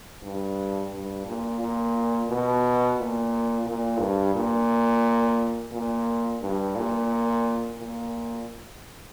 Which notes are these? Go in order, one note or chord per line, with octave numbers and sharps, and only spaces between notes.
G2
G2
A#2
A#2
B2
A#2
A#2
G2
A#2
A#2
G2
A#2
A#2